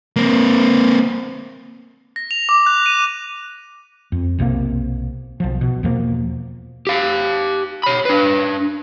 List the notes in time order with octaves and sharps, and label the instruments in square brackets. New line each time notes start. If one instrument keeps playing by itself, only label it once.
[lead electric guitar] A#3 C4
[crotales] A#6
F7
D6
F#6
D#7
[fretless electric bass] F2
B1 C3 E3 A#3
B1 F3
B2
E2 B2 F3 A#3
[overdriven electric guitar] G4 F5
C#5 B5
D4 B4